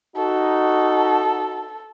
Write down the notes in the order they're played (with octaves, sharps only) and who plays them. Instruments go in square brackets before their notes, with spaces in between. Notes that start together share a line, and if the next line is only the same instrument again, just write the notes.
[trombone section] D#4 F#4 [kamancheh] A4